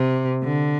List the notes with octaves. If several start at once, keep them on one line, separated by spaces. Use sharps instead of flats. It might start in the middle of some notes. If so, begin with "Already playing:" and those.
Already playing: C3
D3